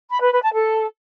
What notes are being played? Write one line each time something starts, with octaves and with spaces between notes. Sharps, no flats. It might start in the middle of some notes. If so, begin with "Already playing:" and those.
B5
B4
B4
A5
A4